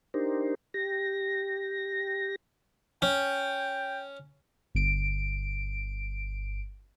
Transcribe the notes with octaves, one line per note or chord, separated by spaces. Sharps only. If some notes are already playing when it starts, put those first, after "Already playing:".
D4 D#4 G4 A#4 C5
G4 A#6
C#4 G5
G1 D7